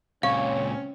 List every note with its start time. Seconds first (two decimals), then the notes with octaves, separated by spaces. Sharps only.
0.23 C#2 A#2 C4 C#4 C#5 F5